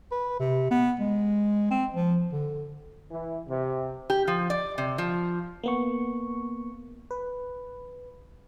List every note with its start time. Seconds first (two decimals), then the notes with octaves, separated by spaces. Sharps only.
0.12 B4
0.40 C3
0.71 B3
1.00 G#3
1.71 C4
1.95 F3
2.32 D3
3.11 E3
3.48 C3
4.10 G4
4.28 F3
4.50 D5
4.78 C3
4.98 F3
5.63 A#3 B3 C#6
7.11 B4